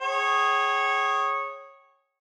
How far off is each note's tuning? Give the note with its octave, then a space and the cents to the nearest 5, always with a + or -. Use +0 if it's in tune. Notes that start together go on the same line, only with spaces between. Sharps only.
G#4 +0 C#5 -15 G5 -40